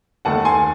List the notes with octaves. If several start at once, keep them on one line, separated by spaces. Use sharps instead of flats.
D#2 D#3 A3 F#5 A5
G#5 C6